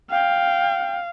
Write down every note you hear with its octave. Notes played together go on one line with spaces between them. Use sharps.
F5 G5